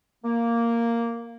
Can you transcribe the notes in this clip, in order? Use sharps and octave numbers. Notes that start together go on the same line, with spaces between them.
A#3